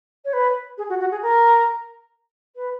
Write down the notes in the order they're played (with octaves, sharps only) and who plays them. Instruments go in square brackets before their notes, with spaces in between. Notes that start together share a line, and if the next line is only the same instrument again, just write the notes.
[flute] C#5
B4
G#4
F#4
F#4
G#4
A#4
B4